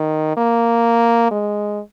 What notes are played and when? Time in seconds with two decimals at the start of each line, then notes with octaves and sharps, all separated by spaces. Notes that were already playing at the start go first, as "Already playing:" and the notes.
Already playing: D#3
0.37 A#3
1.31 G#3